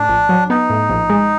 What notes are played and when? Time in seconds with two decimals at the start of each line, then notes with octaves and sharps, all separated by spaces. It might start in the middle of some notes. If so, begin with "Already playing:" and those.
Already playing: A2 D4
0.09 A#1
0.29 F#3
0.50 B3 D#4
0.70 A2
0.90 A#1
1.10 G#3